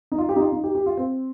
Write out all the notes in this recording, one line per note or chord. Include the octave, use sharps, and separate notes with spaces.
D#4
F4
G4
D#4
F4
D#4
G4
G4
F4
C4